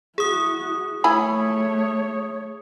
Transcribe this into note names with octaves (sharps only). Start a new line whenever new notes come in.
E4 F#4 G#4 D#6
A3 E4 C#5 G#5 B5